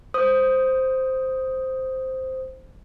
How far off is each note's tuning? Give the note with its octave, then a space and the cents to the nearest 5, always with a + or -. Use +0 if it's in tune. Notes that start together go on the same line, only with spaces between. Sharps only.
C5 +0 D#6 +0